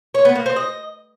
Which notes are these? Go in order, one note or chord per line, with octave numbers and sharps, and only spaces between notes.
C#5
B3
A#3
C4
D#5